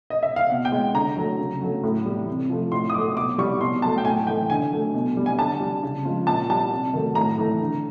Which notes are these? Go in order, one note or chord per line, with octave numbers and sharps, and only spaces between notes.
D#5
E5
F5
B2 F#5
G5
G#3
D3 A#5
F#3 A3
C#3
F#3 A3
A2
E3 G3
C3
F3 A3
A2 C6
D#6
F#3 A3 D6
B2 D6
G3 C#6
B2 C6
F#3 A3 A5
G5
A2 G#5
E3 A3 G5
D3 G#5
F#3 A3
B2
G3
G#5
D3 A5
G3
C#3
F3 G#3
A#2 A5
G3 A5
C3
D#3 F#3 A3
A2 A#5
E3 A3
D3